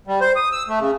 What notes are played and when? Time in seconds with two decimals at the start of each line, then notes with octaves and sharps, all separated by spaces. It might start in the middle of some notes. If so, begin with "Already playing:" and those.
0.07 G3
0.21 C5
0.36 D#6
0.52 E6
0.68 A3
0.80 C#3